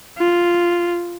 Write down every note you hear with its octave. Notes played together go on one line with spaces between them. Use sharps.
F4